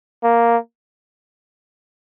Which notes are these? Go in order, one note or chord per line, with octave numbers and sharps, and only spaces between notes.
A#3